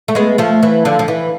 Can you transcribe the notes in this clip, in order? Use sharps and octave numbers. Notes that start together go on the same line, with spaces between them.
A3
G#3 B3
F3 A3
E3
D3 F3
F3
E3